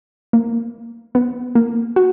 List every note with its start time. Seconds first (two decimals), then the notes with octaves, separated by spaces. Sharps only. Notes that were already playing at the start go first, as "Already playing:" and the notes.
0.33 A#3
1.15 B3
1.55 A#3
1.96 F#4